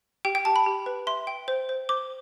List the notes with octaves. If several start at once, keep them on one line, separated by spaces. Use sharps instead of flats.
G4 G5
G5
G4 A5
B5
G4
B4
E5 C6
G5
C5
C5
C5 D6